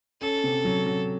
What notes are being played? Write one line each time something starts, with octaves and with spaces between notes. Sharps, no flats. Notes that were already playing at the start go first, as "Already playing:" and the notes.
C#4 A4
C3
F#3
F#3